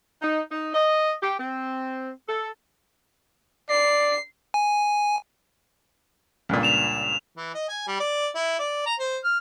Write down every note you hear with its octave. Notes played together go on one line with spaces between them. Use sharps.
D#4
D#4
D#5
G4
C4
A4
D5 C7
G#5
C#2 G2 A#2
E7 F7
E3
D#5
G#5
G3
D5
E4
D5
A#5
C5
F6